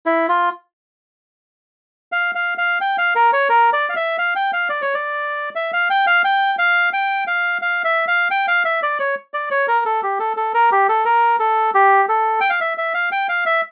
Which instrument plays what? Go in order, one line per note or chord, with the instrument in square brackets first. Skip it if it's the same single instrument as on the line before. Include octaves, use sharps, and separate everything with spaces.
[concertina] E4
F4
F5
F5
F5
G5
F5
A#4
C#5
A#4
D5
F5
E5
F5
G5
F5
D5
C#5
D5
E5
F5
G5
F5
G5
F5
G5
F5
F5
E5
F5
G5
F5
E5
D5
C#5
D5
C#5
A#4
A4
G4
A4
A4
A#4
G4
A4
A#4
A4
G4
A4
G5
F5
E5
E5
F5
G5
F5
E5